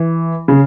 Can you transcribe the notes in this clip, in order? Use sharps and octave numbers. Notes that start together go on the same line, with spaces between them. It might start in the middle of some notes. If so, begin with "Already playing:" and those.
Already playing: E3
C#3